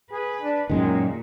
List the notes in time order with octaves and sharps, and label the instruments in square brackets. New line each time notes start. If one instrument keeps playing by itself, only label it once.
[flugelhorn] G#4 [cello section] B4
[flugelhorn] D4
[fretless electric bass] F#2 D#3 [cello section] A#2 [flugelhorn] G#3